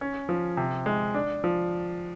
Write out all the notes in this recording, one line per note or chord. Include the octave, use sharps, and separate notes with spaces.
C#4
F3
C3
G#3
D4
F3